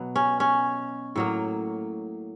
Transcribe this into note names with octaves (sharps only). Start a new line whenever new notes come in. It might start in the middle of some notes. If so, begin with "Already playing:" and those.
Already playing: B2 F#3 B3
C#4
C#4
A2 F#3 A#3